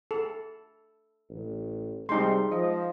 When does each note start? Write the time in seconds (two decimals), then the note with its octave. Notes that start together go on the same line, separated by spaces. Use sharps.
0.11 A4
1.30 A1
2.09 C3 G3 G#3 D#4 C6
2.51 F3 D#5